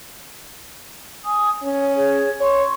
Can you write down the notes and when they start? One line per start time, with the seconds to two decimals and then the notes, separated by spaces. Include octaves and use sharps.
1.24 G#5 D#6
1.63 C#4 C#5
1.96 G#4 C#5
2.41 C#5 C6 C#6